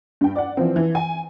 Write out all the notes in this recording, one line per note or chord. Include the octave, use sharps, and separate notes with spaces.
G2 G5
D5 F#5
E3 F3 C4
E3
G#5